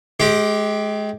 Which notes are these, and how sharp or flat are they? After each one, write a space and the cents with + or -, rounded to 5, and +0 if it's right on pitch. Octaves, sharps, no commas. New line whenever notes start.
G#3 +30 G4 +0